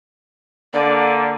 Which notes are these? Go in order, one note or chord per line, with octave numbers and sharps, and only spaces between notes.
D3 A#3 D5